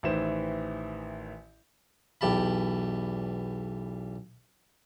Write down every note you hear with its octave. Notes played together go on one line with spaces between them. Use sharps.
A1 D#3 E3 E4 C5 E7
B1 E2 G4 A5 B5